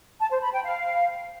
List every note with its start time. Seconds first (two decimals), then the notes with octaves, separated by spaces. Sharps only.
0.20 A5
0.31 C5
0.42 B5
0.53 G5
0.63 F5